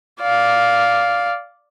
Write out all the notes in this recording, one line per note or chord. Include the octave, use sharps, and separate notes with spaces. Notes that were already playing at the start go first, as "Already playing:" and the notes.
D5 F5